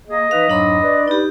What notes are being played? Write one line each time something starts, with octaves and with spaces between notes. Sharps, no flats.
A#3 G#4 D#5
E3 D#4 B4 F5
F2 G#2 F#3 D4 B5 C6
B4 D5
D#4 G4